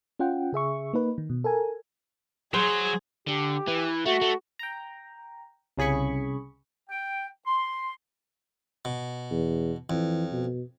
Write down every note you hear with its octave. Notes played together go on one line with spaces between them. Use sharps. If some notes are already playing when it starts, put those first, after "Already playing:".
C#4 F4 F#5 G5
C#3 G#4 E5 C#6
A#3 D#4 B4
D#3
B2
A4 A#4 G#5
F#3 G#4 C5
D3 G4
E3
A3 F#4
A3
G5 A#5
C2 C#3 G#4 B5 C#6
G5
C6
B2
E2
F2 E3
B2